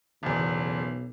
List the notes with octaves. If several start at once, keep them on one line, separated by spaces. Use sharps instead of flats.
F#1 B1 E2